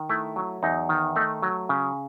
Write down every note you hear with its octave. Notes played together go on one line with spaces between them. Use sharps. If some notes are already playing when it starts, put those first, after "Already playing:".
Already playing: D#3
A3 E4
F#3
E2 D#4
D#3
A3 D#4
F#3
C#3